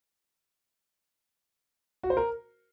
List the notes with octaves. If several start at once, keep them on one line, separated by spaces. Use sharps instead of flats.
F#4
C5
A#4